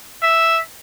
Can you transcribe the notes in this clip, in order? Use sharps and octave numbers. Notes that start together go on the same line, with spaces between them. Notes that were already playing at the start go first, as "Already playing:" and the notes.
E5